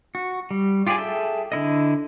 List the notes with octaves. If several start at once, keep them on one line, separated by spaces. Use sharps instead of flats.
F#4
G3
F4 G4 G#4 D5 G#5
G#4 A4 E5 G5
D3 E4 D#5